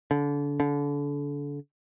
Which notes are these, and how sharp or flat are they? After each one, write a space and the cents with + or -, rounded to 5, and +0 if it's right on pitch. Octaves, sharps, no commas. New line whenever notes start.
D3 -30
D3 -30